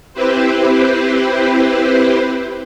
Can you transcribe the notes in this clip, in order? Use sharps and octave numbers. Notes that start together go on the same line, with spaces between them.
C4 E4 G4 B4 C5